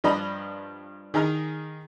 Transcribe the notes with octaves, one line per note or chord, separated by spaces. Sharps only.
G2 F3 D4 D#5 A#5 B5
D#3 G#4 D#5 A#5 F6